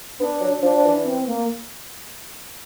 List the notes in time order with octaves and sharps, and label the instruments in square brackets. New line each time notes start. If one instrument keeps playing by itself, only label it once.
[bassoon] B3 [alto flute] D4
[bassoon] F#3
[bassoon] F3 [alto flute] D4
[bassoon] F3
E3
[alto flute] C4
A#3